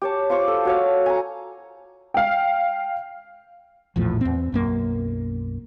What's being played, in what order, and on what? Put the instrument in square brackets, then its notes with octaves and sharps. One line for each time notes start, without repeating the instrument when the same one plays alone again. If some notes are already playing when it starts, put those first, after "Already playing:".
[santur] G4 C#5 A5
F4 C5 C#6 D6
A4
F#4 C#5 F5
G#5 A#5
[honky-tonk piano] F5 G5
[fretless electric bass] A#1 E2 A2 F3
E2 C4
B1 F#2 A#3